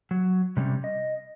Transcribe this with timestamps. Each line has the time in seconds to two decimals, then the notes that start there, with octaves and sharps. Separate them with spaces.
0.11 F#3
0.57 C3 G3 C4 C#4
0.84 D#5